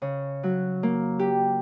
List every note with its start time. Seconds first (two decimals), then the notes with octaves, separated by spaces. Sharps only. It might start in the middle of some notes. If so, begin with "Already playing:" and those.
0.02 C#3
0.43 F#3
0.83 A#3
1.19 G4